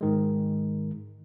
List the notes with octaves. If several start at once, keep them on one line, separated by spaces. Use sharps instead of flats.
G#2 D#3 G#3